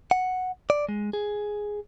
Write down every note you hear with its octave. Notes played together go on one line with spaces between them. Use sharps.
F#5
D5
G#3
G#4